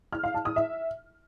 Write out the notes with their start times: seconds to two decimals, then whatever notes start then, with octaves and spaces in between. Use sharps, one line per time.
0.13 F6
0.23 F5
0.34 A5
0.45 D#6
0.56 E5